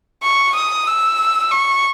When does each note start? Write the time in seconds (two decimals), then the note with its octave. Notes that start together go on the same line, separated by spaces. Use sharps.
0.23 C#6
0.55 D#6
0.87 E6
1.51 C#6